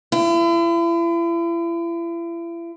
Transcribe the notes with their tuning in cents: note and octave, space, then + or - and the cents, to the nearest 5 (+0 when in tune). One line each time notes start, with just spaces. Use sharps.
E4 +40